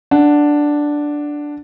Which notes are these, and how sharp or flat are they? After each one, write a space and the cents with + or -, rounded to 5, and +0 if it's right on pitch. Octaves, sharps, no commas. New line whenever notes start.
D4 +0 F#5 +0